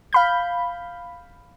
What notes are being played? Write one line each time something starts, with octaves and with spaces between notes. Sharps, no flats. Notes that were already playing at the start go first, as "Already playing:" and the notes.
F5 B5 G6